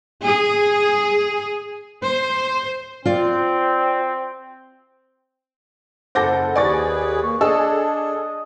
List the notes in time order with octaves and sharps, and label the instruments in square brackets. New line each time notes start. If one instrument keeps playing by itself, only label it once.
[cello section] G#4
C5
[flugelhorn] C4 [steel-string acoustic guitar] F4 D5
[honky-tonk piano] F#1 A4 F#5 [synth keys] C5 [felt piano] D6 G6 A#6
[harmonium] D#2 G#4 B4 [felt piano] D5 C#6 [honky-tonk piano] G#5 A6
[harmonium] A#3 [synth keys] C#6
[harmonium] D4 [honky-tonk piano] G#4 A4 [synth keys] D#5 D#6 [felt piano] E6